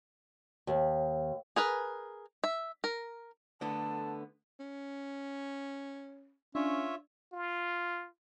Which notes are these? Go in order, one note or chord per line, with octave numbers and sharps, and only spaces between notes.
D#2
G#4 A#4 B4
E5
A#4
D3 A3 B3 A5
C#4
C#4 D4 F4 C#5 E5
F4